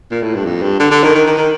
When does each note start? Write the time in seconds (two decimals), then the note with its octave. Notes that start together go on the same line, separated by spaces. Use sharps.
0.11 A#2
0.23 A2
0.34 G2
0.45 F2
0.62 G2
0.80 D3
0.91 D3
1.03 D#3
1.15 D#3
1.27 D#3
1.37 D#3